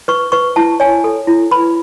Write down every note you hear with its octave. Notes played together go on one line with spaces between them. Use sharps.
B4 C#6
B4 C#6
E4 A5
C#5 G#5
A4
E4
B4 B5